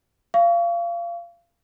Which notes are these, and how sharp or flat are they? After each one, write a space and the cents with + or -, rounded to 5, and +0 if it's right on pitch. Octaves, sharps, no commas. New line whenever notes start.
F5 -25 C#6 +30